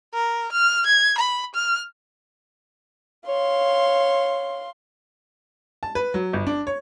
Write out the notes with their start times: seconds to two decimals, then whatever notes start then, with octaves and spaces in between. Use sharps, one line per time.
0.14 A#4
0.52 F6
0.86 G#6
1.18 B5
1.55 F6
3.28 C#5 F5 C6
5.83 A5
5.95 B4
6.14 F#3
6.33 G1
6.47 D4
6.67 C#5